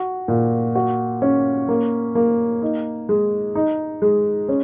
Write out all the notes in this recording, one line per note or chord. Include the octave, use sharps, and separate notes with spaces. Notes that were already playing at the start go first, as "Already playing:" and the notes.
Already playing: F#4
A#2
F#4
C#4
A#3
A#3
D#4
G#3
D#4
G#3
C#4